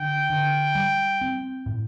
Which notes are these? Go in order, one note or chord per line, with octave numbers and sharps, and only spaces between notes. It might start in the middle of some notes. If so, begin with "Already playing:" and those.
Already playing: D3 G5
D3
G3
C4
A2